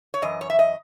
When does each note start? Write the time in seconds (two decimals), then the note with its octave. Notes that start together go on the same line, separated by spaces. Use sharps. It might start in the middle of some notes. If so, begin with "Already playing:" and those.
0.14 C#5
0.22 F#2 E3 D#5
0.41 C#5
0.50 E5
0.59 D#5